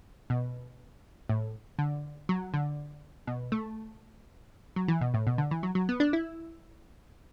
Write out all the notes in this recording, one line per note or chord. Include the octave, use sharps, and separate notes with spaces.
B2
A2
D3
F#3
D3
B2
A3
F#3
E3
B2
A2
B2
D3
E3
F#3
F#3
B3
D4
E4